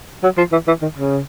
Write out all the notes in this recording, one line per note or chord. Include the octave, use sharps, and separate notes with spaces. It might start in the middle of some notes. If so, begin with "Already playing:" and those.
F#3
F3
E3
E3
D#3
C#3